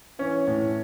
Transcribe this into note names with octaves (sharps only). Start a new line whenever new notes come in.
E3 C#4
A2